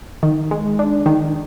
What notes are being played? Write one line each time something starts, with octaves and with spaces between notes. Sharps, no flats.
D#3
G#3
D4
D#3